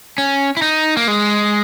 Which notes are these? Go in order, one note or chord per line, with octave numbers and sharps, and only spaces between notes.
C#4
E4
D#4
A#3
G#3